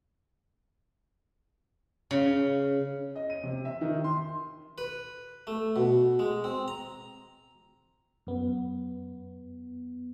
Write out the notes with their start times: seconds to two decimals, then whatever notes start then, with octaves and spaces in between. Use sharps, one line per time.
2.11 C#3
3.16 D#5
3.30 D#7
3.43 C3
3.65 E5
3.81 D#3
4.04 C6
4.78 B4
5.47 A3
5.76 B2
6.19 G#3
6.44 C4
6.68 A#5
8.27 F#2 B3